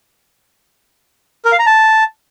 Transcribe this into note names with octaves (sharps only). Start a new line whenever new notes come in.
A#4
F5
A#5
A5